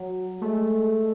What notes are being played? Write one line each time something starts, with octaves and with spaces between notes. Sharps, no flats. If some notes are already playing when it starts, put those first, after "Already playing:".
Already playing: F#3
G#3 A3